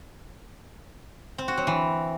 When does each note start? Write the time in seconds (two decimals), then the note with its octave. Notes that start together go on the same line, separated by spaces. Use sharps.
1.38 C4
1.48 F#4
1.57 F#3
1.67 E3